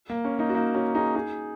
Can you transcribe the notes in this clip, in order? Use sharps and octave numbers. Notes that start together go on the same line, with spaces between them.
A#3
C#4
A#3 D#4
F#4
A#3 D#4
C#4 F#4
D#4 G#4
D#4 G#4